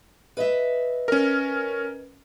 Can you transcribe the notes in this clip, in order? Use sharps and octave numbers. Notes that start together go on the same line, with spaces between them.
B4 D#5 E5
C#4 A#4